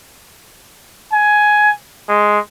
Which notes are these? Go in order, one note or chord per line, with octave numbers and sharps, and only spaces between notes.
G#5
G#3